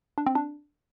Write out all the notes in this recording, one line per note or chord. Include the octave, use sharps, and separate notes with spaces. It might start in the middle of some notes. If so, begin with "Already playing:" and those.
D4
C4
D4